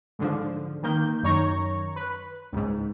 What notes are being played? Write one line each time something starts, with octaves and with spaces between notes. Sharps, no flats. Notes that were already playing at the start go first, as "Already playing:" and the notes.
G#2 D3 F3
D#3 A#3 G6
F#2 D#3 C#5 A#5 C#6
B4
C#2 G#2